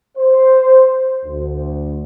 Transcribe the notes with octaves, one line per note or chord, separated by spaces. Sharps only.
C5
D2